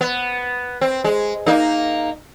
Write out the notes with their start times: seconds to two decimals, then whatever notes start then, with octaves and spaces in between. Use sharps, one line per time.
0.01 B3
0.81 C4
1.04 G#3
1.46 A#3 D#4